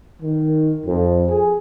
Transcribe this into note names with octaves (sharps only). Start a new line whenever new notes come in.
D#3
F2
G#4